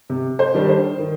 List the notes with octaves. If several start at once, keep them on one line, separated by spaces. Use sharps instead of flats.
C3
C5
D#3 G3 D4
C5
D#3